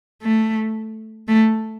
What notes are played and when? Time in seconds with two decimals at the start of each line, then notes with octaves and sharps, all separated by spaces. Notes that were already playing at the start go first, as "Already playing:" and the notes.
0.22 A3
1.28 A3